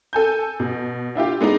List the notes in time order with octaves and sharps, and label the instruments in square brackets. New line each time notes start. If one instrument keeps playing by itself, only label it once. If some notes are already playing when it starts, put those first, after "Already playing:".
[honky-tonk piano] A4 G#5 G6
B2
D4 E4 F4 G4
G#3 B3 D4 D#4